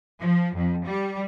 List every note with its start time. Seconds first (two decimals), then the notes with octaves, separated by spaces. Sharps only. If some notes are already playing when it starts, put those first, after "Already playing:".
0.20 F3
0.56 F2
0.85 G3